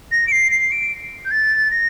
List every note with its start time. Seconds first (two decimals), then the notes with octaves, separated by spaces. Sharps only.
0.12 A#6
0.27 D7
0.32 C7
0.51 C7
0.71 D7
1.25 G6
1.31 A6
1.71 A#6